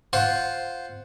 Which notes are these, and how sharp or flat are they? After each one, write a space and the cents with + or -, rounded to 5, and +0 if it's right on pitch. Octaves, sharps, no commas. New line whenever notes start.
F4 +0 C5 +0 F#5 +0